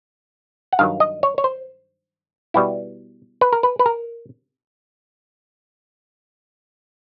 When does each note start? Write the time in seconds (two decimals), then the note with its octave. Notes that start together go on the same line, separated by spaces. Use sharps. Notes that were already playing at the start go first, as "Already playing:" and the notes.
0.73 F#5
0.79 G2 D#3 F#3 F5
1.00 D#5
1.23 C#5
1.38 C#5
1.44 C5
2.54 B2 G3 B3 E4
3.41 B4
3.53 A#4
3.63 B4
3.79 B4
3.86 A#4